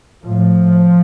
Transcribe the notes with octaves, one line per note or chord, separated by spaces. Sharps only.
A2 F3